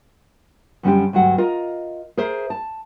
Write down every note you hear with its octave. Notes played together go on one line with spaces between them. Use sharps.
F#2 D3 G3 C#4 D4 G4
D2 G2 F#3 F#5
F4 A#4 D#5
G#4 A#4 C5 E5
A5